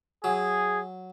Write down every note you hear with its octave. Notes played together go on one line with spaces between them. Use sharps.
F#3 G#4